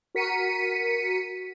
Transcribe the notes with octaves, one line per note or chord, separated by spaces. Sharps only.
F#4 A#4 B6 C#7 D#7